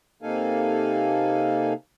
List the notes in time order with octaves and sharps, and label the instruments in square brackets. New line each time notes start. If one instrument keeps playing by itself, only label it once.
[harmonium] C3 A#3 D#4 A4 F5 G#5